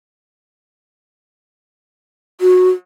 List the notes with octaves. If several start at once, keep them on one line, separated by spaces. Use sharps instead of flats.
F#4